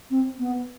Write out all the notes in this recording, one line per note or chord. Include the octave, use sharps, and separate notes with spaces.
C4
B3